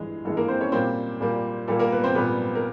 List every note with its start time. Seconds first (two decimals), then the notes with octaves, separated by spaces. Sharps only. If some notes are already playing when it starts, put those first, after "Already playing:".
Already playing: G2 E3 G#3 G#4
0.25 G2 E3 G#3 A4
0.37 A#3 A#4
0.48 C4 C5
0.61 C#4 C#5
0.72 A#2 G3 A#3 C4 C5
1.21 A#2 G3 A#3
1.68 A#2 G3 A#3 A4
1.79 A#3 A#4
1.92 B3 B4
2.04 C4 C5
2.15 A#2 G3 A#3 B3 B4
2.55 A#4